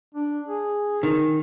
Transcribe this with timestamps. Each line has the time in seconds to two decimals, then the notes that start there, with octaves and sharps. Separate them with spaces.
0.15 D4
0.48 G#4
1.03 D#3